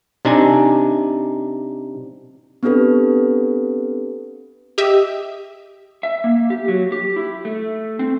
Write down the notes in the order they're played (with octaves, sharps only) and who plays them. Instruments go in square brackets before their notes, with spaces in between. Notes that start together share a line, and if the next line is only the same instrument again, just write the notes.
[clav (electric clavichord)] C3 D4 D#4 G#5
[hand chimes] B3 C4 D4 G4 A4 B4
[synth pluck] G4 D#5 E5
[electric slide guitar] E5
A#3
G4
F#3
G4
E4
A3
C4